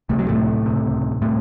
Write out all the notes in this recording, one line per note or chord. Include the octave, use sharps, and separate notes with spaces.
C#2 C3 A3
F#3
A2 A3
C#2 C3
A2 C3 A3